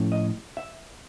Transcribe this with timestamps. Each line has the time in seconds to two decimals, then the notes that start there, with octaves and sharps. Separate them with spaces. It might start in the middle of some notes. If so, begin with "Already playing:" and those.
Already playing: A2 F3 A3 C#4
0.12 D#5
0.57 E5